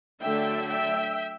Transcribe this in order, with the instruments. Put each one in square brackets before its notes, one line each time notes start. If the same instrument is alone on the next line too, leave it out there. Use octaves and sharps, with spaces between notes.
[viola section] D3 F#3 A3 D4 E5 G5
E5 G5